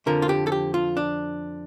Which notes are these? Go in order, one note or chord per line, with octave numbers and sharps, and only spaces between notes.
F2 D3 F3 A#4
F4
G4
A4
G4
F4
D4